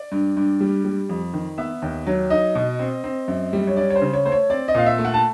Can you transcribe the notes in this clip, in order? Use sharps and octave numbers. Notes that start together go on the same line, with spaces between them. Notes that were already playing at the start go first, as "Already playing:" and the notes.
Already playing: D5
G2
G2
G3
G3
F2
D#3
B3 E5
D#2
F#3
D#4 D#5
B2
C4
C4
F#2
G3
C#5
C#4 D5
C#5
C5
C#3
C#5
A3 C5
C#5
C4 D5
D#5
A#2 F5
E5
A3
F#5
A5